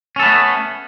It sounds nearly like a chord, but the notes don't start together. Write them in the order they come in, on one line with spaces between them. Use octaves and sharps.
C#4 A4 B3 A3